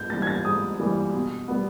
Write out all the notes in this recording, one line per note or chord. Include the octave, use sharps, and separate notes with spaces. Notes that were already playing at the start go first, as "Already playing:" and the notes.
Already playing: G#2 G6
E3 G3 A#3 A6
G#6
A6
G#2 D#6
E3 G3 A#3
B2
G3 B3